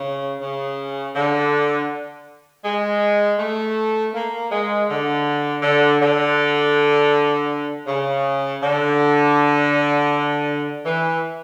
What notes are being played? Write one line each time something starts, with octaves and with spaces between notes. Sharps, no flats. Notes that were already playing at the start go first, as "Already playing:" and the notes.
Already playing: C#3
C#3
D3
G#3
A3
A#3
G#3
D3
D3
D3
C#3
D3
E3